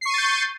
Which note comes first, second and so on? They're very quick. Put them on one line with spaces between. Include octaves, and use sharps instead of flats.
C7 C#6 D#7 A6 G6